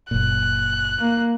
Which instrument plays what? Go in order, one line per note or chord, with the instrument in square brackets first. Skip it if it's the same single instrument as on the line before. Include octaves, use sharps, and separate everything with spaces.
[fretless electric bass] F#1 A#2 [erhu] F#6
[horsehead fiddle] A#3